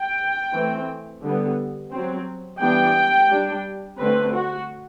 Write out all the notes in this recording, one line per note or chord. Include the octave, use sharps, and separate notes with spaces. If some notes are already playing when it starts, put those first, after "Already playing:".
Already playing: G5
E3 A3 C4
D3 G3 B3
F#3 C4
E3 G3 B3 D4 G5
G3 D4
D3 A3 C4 B4
F#4